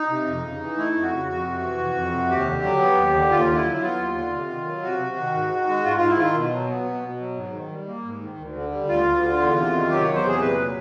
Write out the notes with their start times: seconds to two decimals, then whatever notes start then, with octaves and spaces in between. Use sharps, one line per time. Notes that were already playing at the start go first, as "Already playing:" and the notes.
Already playing: D#4
0.09 C3
0.26 F2
0.43 C#3
0.60 E3
0.77 A3 E4
0.94 F2
1.03 F#4
1.11 C#3
1.28 F2 F#4
1.45 C3
1.62 E3
1.78 F2
1.95 F2
2.13 C3
2.29 D#2 G4
2.46 D3
2.63 F#3
2.80 B3
2.97 D#2
3.14 D3
3.31 D#2 F4
3.48 D3
3.56 E4
3.64 F#3
3.81 B3 F4
3.98 D#2
4.15 D3
4.32 C3
4.49 D#3
4.66 F#3
4.83 C3 F#4
5.00 C3
5.16 D#3
5.33 G#2
5.51 D#3
5.67 G#3
5.84 G#2 F4
5.97 G#2 F4
6.10 E4
6.18 D#3 F4
6.35 B2
6.52 F#3
6.69 B3
6.86 B2
7.03 B2
7.20 F#3
7.36 G#2
7.53 D#3
7.71 G3
7.87 A#3
8.04 G#2
8.21 D#3
8.38 D2
8.55 D3
8.72 G3
8.89 D2 F4
9.06 D2
9.22 D3
9.40 E2
9.56 C3
9.72 D#3
9.90 F#3 G4
10.03 E2 C#5
10.15 C5
10.24 C3 G#4
10.41 A#2 B4
10.58 F#3